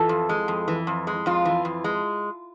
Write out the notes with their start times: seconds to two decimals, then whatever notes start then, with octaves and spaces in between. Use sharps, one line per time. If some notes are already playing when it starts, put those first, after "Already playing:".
Already playing: E3 F4 A4
0.09 F2
0.29 G#3
0.48 F2
0.68 E3
0.87 F2
1.07 G#3
1.26 F2 F4
1.45 E3
1.65 F2
1.84 G#3